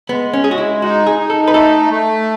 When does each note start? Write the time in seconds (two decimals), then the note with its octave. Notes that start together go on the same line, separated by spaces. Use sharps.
0.09 G#3 B3
0.33 C#4
0.44 G#3 G#4
0.51 F#4
0.58 E4
0.82 D#4 F#4
1.07 G#4
1.18 D#4
1.30 A4
1.48 B4
1.54 A3 A4
1.90 A3